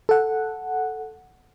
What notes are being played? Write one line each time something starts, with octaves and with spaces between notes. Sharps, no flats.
A4 F#5